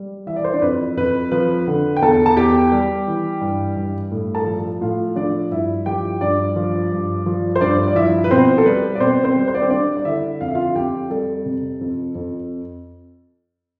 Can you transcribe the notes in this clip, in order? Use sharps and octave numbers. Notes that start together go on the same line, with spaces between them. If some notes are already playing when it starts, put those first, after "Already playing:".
Already playing: G3
E3 E5
D5
C5
D4 D5
F2 B4
F2 B4
F3 B4
D3
G5
E2 A4 A5
A5
E2 G4 G5
G3
E3
G2
G2
A2
A4 A5
F3
A2 F4 F5
F3 D4 D5
G2 E4 E5
F3 G4 G5
G2 D4 D5
F3
G2
F3
C5
G2 D4 D5
D5
F3 E4 E5
B4
B2 C4 C5
A4
G3 B4
D5
B2 C4 C5
C4 C5
G3
C5
D5
C4 C5
G3 D4 D5
D5
D3 E4 E5
F2 F5
E5
F4 F5
F2 G4 G5
G3 A4
C3
F2
F2